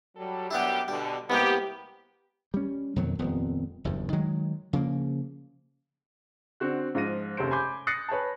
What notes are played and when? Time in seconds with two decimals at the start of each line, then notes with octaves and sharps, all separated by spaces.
0.16 F#3 G3 A4
0.51 F#2 G3 B3 D4 E4 G4
0.88 B2 D3 G3
1.30 C2 G#3 A#3 B3 G4
2.54 G3 C#4
2.96 F2 B2 D#3 F#3
3.19 D#1 F2 B3 C4
3.84 F#1 E2 G2
4.13 D#3 F#3 G#3
4.73 C#3 F3 A#3
6.60 D3 C4 F#4 F#6
6.95 G#2 F3 F4 A#6 D#7
7.37 F1 D#2 C3 C#4 C5 D7
7.51 G#5 B5 C6 D6 G6
7.87 D#6 F#6 A6 A#6 C7 C#7
8.09 B4 C#5 G#5 A5